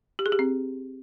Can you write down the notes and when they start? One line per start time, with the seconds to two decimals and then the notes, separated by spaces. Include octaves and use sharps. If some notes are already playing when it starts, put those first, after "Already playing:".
0.19 G4
0.26 G#4
0.32 G4
0.39 C4